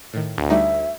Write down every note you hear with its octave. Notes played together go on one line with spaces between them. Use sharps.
A2 D#3
D2
G3 A3 D#4 E5